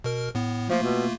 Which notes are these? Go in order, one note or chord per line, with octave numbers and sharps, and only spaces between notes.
B2 A#4 F6
A2 B3
F3 A3 A#3 F4
B2